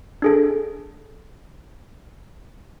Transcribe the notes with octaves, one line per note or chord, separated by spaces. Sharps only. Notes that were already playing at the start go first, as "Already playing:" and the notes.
D4 G#4 A4